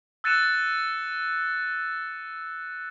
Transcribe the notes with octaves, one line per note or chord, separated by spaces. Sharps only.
E6 F#6 A6 C#7 D#7 E7